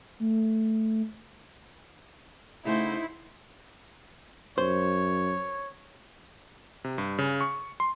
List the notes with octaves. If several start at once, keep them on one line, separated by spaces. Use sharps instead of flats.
A3
C#3 A3 D#4 E4 C5 F#5
F#2 C5 C#5
C3
G2
C#3
C#6
C6